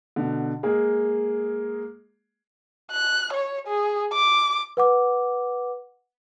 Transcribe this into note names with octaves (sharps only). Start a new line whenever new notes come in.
B2 D3
G#3 A#3 G#4
F#6
C#5
G#4
D6
B4 F#5 D6